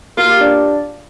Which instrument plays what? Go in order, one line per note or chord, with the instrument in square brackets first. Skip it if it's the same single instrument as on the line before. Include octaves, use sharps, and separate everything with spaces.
[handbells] A#3 A#4 [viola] F4
[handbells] G4
D4 D5